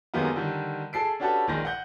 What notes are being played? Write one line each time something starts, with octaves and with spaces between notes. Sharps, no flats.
F#2 C3 D#3 G#3 A#3 B3
D3 D#3 G3
G#4 A4 C7 D7
C#4 D4 F#4 G4 A4 B4
A#1 D#3 G#3 A#6
F#5 G6